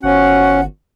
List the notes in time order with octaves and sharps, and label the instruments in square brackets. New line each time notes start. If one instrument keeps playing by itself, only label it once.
[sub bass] G1 [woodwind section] F3 F#4 F#5 [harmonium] C#4